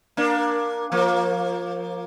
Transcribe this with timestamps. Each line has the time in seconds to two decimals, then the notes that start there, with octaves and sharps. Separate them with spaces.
0.17 A#3 D4
0.92 F3 A#3